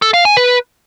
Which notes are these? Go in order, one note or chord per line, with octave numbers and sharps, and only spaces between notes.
A4
F5
G#5
B4